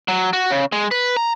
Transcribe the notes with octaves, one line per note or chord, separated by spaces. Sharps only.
F#3
F#4
C#3
G#3
B4
A#5